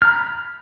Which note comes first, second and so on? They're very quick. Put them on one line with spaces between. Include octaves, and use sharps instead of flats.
F6 A#5 B5